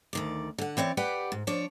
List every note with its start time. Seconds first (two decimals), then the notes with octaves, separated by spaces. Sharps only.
0.13 D2 D#3 D5
0.58 D3 F#5
0.77 E3 C4 C#5 D5
0.97 G4 B4 D5 F#5 G5
1.32 G#2
1.47 F3 D4 C#5 D5